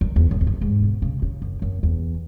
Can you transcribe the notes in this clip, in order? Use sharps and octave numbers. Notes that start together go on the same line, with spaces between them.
F#2
E2
F#2
E2
F#2
G#2
B2
C#3
C#3
F#2
F#2
E2